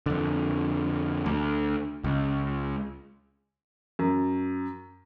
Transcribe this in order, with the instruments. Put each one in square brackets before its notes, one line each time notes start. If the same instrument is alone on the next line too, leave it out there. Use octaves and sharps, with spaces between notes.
[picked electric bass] F2 D3
D2
C#2
[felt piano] F#2